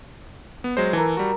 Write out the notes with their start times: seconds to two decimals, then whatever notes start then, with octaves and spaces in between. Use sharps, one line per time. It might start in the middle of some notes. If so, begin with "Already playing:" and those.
0.64 B3
0.77 F#3 G#3 C5
0.93 E3 A4 A#4
1.17 G3 F#4